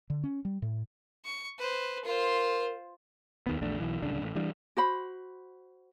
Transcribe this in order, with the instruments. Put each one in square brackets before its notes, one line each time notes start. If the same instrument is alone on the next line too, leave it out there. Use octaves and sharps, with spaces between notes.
[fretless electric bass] D3
C#4
G3
A2
[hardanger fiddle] C#6
B4 C5
[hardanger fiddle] F4 C5 [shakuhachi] A#4
[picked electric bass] D#2 D#3 B3
A#1 E2 A3 D4
B1 E3
D1 C2 C#3 D4
A1
E3 G3 D4
[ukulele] F#4 C5 B5